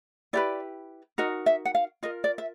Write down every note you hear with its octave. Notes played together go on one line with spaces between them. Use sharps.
E4 G4 B4 D5
D#4 F#4 A#4 D#5
E5
F#5
F5
F4 A#4 D#5
D5
E5